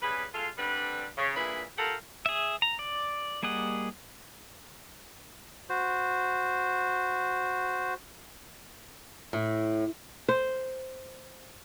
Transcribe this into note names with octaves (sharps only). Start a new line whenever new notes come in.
C#3 G3 G#4 B4
G#3 F4 A4 F5
D3 G3 C4 B4
C#3
A#2 D3 E3 E4 G#4 B4
F4 G4 A4 A#4 F5 F#5
G#4 E5
A#5
D5
G3 A#3 G#4 D#5 F#5
F#4 C5
A2
C5